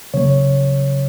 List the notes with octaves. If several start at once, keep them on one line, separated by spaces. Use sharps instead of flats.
C#3 F#3 A#3 C#5